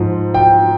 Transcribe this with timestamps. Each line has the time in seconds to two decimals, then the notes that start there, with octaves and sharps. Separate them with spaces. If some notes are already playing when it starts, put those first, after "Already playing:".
Already playing: G#2 F3
0.34 G5